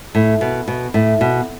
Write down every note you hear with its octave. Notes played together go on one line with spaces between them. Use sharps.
A2
B2
B2
A2
B2